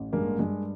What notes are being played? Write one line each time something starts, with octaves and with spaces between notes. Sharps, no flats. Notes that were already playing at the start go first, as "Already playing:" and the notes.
Already playing: A1
G2 G#3 A#3
G2 G#3